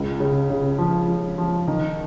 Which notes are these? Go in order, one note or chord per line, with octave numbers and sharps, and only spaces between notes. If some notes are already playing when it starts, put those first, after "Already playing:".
Already playing: C#2
C#3
C#3
F3
F3
F3
D#3